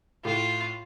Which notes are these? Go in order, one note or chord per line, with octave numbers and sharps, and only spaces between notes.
A2 F4